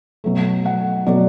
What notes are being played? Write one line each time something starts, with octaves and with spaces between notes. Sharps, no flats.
B2 F#3 A3
F#5
B2 F#3 A3 D5